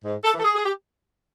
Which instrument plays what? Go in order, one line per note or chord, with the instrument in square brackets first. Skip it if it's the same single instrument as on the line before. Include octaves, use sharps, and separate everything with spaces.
[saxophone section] G#2
A4
E3
A4
G#4
G#4
G4